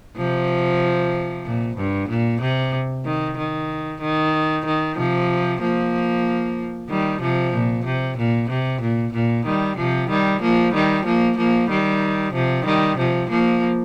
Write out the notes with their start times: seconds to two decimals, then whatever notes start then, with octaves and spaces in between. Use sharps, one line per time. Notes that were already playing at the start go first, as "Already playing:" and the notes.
0.17 C3 F3
1.45 A#2
1.77 G2
2.09 A#2
2.41 C3
3.05 D#3
3.37 D#3
4.01 D#3
4.65 D#3
4.97 C3 F3
5.61 F3 A#3
6.90 D#3 G3
7.22 C3 F3
7.53 A#2
7.85 C3
8.18 A#2
8.49 C3
8.81 A#2
9.13 A#2
9.45 D#3 G3
9.77 C3 F3
10.10 D#3 G3
10.41 F3 A#3
10.73 D#3 G3
11.05 F3 A#3
11.37 F3 A#3
11.69 D#3 G3
12.33 C3 F3
12.66 D#3 G3
12.98 C3 F3
13.30 F3 A#3